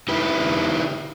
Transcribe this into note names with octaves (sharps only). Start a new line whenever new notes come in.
D#4 E4 G4 B4